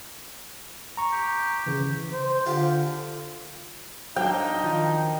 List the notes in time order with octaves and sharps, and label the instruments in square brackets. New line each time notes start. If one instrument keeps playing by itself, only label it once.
[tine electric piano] A#5 C#6
[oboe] G4
[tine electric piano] C#3 E3
[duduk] C5
[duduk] D3 [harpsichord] F4 G4
[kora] F#3 D4 [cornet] D#4 [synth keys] F5 [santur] G5
[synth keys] D#3 F3